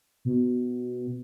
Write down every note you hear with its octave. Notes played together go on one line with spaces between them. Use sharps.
B2